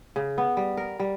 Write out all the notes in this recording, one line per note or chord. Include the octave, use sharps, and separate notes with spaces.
C#3
B3
G3
A#4
G3